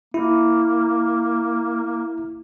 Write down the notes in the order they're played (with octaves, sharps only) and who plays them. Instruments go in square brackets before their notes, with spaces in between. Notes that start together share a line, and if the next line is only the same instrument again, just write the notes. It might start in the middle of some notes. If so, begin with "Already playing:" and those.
[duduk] A#3 [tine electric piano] E4